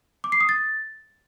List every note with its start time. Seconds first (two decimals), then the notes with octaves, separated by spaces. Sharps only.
0.24 D6
0.32 C7
0.41 D#6
0.49 A6